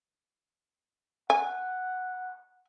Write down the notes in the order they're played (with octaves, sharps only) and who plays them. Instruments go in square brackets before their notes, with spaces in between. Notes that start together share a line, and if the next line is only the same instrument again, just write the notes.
[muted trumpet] F#5 [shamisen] G#5